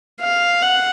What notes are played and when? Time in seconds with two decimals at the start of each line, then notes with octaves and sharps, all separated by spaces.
0.21 F5
0.62 F#5